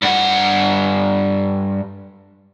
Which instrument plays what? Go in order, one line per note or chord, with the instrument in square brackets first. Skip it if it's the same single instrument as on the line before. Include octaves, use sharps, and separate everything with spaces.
[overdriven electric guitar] G2 F#5